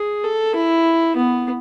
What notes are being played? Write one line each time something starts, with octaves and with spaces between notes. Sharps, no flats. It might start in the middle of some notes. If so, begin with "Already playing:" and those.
Already playing: G#4
A4
E4
B3